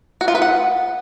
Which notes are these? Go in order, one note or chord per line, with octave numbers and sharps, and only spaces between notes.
F#4
F4
B4
F#5